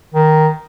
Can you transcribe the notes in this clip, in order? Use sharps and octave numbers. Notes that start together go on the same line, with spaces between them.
D#3